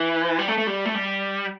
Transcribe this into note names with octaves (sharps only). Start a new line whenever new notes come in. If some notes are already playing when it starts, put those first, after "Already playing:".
Already playing: E3
G3
A3
A3
G3
A3
G3